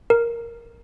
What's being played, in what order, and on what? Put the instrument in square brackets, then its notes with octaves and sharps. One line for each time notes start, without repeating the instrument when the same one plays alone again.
[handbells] A#4